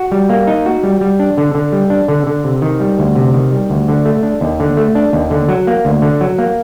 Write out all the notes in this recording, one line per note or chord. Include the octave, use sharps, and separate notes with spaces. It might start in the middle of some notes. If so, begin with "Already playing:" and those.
Already playing: F#4
G3
A#3
D#4
F#4
G3
G3
D4
D3
D3
G3
D4
D3
D3
C3
D#3
G3
D2
C3
D#3
G3
D2
D3
A3
D4
D#2
D3
A3
D4
D#2
D3
F#3
A#3
D2
D3
F#3
A#3